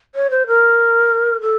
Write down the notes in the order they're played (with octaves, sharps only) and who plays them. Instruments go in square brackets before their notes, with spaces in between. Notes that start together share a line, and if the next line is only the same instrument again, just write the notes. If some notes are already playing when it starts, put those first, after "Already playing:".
[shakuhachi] C#5
C5
A#4
A4